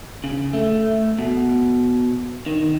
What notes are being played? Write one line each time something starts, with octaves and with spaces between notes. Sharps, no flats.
C#3
A3
B2
D#3